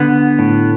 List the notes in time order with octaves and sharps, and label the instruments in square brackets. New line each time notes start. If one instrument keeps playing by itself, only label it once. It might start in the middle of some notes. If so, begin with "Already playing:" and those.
Already playing: [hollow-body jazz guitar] D3 [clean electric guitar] B3
[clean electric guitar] A2